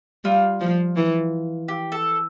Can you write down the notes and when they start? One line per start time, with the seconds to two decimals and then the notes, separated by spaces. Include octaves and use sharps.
0.24 G3 F4
0.60 F3
0.96 E3
1.68 G4
1.92 A4